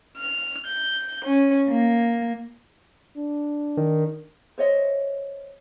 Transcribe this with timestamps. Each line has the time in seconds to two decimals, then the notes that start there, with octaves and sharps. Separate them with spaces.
0.17 F6
0.67 G6
1.25 C#4
1.68 A#3
3.17 D4
3.77 D#3
4.58 C5 C#5 D#5 E5